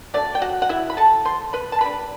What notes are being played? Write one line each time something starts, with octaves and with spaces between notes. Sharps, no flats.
F#3 A3 D4 D5
G5
F#4 F#5
F#5
E4 E5
B5
A4 A5
C5 C6
B4 B5
A5
D3 G3 D4 B4 B5